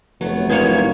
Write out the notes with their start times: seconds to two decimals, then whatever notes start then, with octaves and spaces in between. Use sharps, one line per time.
0.21 F1 F#3 A3 B3
0.50 G#3 A#3 E4 B4 C#5 G#6